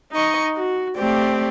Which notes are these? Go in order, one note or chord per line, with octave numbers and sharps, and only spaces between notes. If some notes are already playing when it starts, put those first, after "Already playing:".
D#4 D#5 C#6
F#4
A3 C4 G4 D5